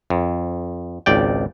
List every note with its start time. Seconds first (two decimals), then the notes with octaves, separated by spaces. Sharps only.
0.10 F2
1.06 G#1 C#2 D5 G5